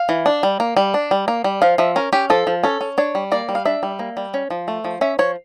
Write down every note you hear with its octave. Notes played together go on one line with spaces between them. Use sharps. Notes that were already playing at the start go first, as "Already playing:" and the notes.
Already playing: F5
E3
D4
G3
A#3
G3
D4
G3
A#3
G3
F3 F5
F3 E5
C#4 A#4
C#4 G4
F3 A4
F3
C#4 A4
C#4
D4 C#5
G3
A#3 D5
G3
F5
D4 E5
G3
A#3
G3
C#4
F3
A3
F3
C#4 E5
F3 C#5